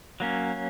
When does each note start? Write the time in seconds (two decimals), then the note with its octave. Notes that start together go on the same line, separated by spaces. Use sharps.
0.20 F#3 A#3 C#4